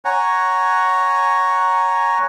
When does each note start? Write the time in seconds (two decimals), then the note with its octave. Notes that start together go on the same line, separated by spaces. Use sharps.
0.05 C#5 F#5 G#5 A#5